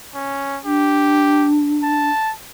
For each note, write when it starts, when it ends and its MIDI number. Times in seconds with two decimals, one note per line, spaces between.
0.15 0.59 61
0.65 2.09 62
0.65 1.49 67
1.83 2.33 81